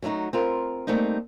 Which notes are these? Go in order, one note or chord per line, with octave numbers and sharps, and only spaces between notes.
F#3 A3 B3 D#4 F#4
C4 F4 A#4
G3 A3 A#3 C4 D#4